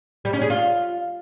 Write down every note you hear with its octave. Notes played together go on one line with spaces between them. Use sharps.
G3
C#4
G#4
F4